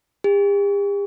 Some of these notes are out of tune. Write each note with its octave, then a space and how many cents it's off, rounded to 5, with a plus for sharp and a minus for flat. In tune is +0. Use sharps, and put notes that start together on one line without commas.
G4 +45